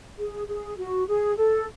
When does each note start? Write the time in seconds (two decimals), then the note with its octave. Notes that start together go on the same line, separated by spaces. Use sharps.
0.18 G#4
0.47 G#4
0.77 F#4
1.07 G#4
1.36 A4